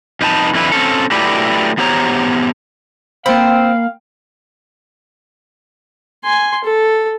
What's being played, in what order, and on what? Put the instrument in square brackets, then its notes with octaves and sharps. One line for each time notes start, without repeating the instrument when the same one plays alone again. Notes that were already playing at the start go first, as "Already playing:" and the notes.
[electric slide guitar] F2 D#4 B4 G#5 A5
F2 D3 E4 B4
C4 C#4 A4
F#3 A3 E4 G4 B4 D5
E2 B3 G4 C5 C#5 A#5
[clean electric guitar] A#3 B5 [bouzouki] C4 [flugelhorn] F5
[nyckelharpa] G#5 C6
A4